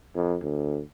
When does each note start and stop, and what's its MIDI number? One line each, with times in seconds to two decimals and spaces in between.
0.14 0.36 41
0.42 0.80 38